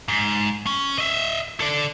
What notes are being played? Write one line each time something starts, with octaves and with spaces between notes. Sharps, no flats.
G#2
C#4
D#5 E5
A4 D5